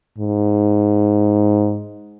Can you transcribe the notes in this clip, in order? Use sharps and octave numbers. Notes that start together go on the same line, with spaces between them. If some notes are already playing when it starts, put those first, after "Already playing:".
G#2